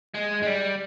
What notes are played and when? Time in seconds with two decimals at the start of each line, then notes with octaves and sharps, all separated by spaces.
0.15 G#3
0.43 G#3
0.46 G3